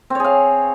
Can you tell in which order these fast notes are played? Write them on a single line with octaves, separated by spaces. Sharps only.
C4 C#5 G#4 F5